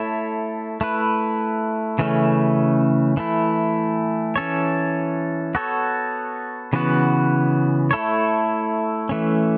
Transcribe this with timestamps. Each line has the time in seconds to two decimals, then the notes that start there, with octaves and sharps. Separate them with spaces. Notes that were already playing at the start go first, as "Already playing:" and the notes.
Already playing: A3 E4 A4 C#5
0.81 A3 E4 B4
1.99 C#3 E3 A3 C#4
3.17 E3 A3 E4
4.36 E3 C#4 A4 C#5
5.55 B3 F#4 A4 C#5
6.73 C#3 E3 B3 F#4
7.91 A3 E4 A4 C#5
9.09 E3 A3 C#4